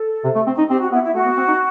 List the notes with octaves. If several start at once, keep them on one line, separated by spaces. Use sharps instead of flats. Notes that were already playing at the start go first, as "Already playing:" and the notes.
Already playing: A4
C3
A3
C4
D#4
C4 G4
F#4
B3 E4
E4
A3 F#4
B3
C4
D#4